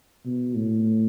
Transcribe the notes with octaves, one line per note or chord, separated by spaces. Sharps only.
B2
A2